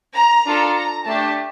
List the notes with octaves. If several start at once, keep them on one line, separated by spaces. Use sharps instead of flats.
A#5
D4 F4 A4
A#5
A3 D4 G4 A5